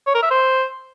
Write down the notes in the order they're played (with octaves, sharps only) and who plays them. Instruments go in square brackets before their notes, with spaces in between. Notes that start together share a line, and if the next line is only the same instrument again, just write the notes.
[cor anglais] C#5
A#4
E5
C5